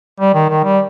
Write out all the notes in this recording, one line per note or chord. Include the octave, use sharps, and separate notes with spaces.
G3
D#3
D#3
G3